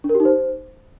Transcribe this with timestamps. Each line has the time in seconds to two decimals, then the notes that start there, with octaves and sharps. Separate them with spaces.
0.04 D4
0.09 A#4
0.15 G4
0.20 D#4
0.25 C5